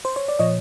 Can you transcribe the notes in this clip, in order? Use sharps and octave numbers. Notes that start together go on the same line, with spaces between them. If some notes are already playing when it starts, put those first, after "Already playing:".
C5
C#5
D5
A#2 F3 C#5 D#5